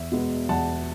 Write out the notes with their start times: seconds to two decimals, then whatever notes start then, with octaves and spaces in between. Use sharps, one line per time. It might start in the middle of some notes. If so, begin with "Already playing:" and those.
Already playing: E2 E5
0.12 B2 G#3 B3
0.49 E2 F#5 A5